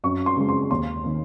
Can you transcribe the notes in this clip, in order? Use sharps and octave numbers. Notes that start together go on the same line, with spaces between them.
F#2 C#6
C6
C#3 G#3 C4
C6
D#2 C6
D#3 A#3